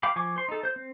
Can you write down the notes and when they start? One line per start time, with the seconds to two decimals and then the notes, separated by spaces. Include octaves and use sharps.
0.03 F5 G5 B5 D6
0.16 F3 G#5 C#6 D6
0.36 C5 C6
0.49 D#4 A4
0.63 C5 G6
0.76 C4